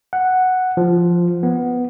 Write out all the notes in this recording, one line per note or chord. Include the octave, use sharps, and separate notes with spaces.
F#5
F3
B3